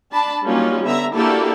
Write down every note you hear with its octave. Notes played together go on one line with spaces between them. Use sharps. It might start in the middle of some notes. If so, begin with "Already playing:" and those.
D4 A5 B5
F#3 G3 A#3 C#4 D#4 F4
D3 B3 E5 A#5
A#3 D4 E4 F#4 G4 A4